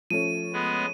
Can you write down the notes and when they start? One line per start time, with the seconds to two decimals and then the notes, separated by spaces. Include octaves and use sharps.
0.10 F3 A3 C#4 D#7
0.53 G#3 B3